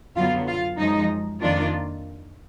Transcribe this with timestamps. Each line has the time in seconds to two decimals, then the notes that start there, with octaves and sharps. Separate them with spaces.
0.16 F#2 D3 F#3 B3 F4 F5
0.47 F4 F5
0.78 F#2 F3 G#3 D#4 D#5
1.42 F2 D#3 A#3 D4 F4 D5